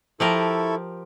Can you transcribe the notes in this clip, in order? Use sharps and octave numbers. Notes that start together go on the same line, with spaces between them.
F3 E4 G4 A4 A#4 C#6